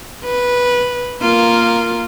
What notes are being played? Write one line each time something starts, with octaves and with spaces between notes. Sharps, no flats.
B4
A#3 F4 A#4